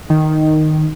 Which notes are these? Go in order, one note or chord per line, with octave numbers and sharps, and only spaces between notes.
D#3